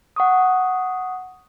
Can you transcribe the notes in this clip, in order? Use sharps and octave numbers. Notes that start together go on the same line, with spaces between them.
F#5 C#6 D#6